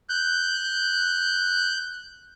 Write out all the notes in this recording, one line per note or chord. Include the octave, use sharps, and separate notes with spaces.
F#6 G6